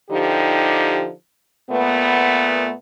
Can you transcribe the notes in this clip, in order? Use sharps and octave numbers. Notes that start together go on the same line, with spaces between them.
D3 F3 D#4 G4
A#2 A3 B3